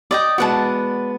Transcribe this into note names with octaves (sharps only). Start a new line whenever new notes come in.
D5 D#5 G5
G#3 B3 F#4 D5 F#5 A5